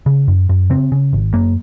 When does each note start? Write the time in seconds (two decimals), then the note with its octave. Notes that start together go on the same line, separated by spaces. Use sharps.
0.06 C#3
0.28 F#2
0.49 F#2
0.70 C#3 C4
0.92 C#3
1.13 G#1
1.34 F#2 A#3